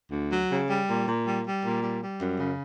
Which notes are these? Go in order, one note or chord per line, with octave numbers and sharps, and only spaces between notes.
D2
F#3
C#3
G3
A#2
A#2
G3
G3
A#2
G3
G3
F#2
C#3